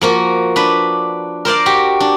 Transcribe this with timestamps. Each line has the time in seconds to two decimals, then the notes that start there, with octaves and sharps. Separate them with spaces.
0.01 F3 A#3 F#4
0.56 D4 B4
1.45 A#4 C5 D5 F5
1.66 F#4 G4
2.00 D4